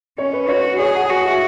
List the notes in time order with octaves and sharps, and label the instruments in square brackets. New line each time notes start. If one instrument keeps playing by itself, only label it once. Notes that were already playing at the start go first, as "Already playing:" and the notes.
[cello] C#4 [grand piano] C#5
[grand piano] B4
[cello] F#4 [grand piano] C#5
[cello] G#4 [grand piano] C#5
[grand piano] F#5
F#5
[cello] F#4 [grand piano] G#5
[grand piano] E5